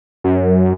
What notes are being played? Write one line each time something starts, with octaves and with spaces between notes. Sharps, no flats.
F#2